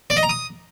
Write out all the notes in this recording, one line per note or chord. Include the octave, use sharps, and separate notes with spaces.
D5
D#5
A#5
D#6